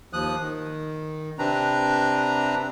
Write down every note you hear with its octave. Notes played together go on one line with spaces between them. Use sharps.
D#2 F3 D#6 F#6
D#3
C3 C4 D4 B4 A#5